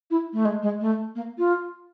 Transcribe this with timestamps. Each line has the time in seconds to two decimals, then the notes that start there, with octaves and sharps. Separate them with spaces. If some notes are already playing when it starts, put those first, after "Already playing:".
0.11 E4
0.33 A3
0.45 G#3
0.62 G#3
0.80 A3
1.15 A#3
1.38 F4